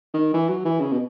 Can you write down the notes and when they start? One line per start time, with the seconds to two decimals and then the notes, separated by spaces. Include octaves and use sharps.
0.14 D#3
0.34 E3
0.49 F#3
0.65 E3
0.80 C#3
0.92 B2